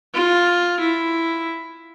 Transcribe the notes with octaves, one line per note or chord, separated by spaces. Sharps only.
F4
E4